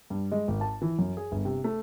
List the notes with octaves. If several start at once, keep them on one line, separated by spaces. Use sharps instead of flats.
G2
G#3
G#1
A5
E3
F#2
G#4
G1
C3
A3